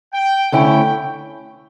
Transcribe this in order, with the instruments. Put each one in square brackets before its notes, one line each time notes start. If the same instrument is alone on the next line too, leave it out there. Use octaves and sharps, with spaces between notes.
[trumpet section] G5
[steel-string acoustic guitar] D2 D3 A3 C#4 E4 [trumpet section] G5